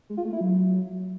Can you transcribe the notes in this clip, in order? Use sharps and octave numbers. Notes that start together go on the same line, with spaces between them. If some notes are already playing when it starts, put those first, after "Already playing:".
G#3
F4
A3
E4
F#3